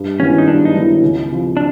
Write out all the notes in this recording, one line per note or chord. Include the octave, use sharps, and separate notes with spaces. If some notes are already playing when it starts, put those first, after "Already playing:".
Already playing: G2
D#3 F#3 B3 C#4 E4
D#4
G2 D4
D#4
D#3 F#3 B3 E4
C#2
C3 F3
D4